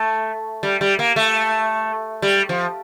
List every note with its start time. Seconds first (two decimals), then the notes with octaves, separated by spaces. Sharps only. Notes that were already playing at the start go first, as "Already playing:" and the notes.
Already playing: A3
0.63 G3
0.81 G3
0.99 A#3
1.16 A3
2.22 G3
2.49 F3